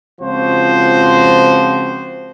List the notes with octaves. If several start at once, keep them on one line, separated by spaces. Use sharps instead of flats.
C#2 F3 C4 F#4 C5